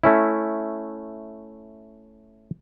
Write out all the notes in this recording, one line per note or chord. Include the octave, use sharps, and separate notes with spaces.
A3 C#4 E4